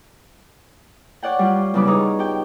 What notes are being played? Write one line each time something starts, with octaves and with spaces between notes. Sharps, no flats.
C#5 D5 F#5 G5
G3 F4
E2 C#3 G3 B3 D6
B3 D#4 G#4 C#5
G4 G5